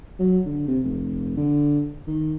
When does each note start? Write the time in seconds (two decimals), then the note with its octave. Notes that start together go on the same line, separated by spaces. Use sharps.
0.20 F#3
0.46 D3
0.68 C3
0.84 F1
1.37 D3
2.07 D#3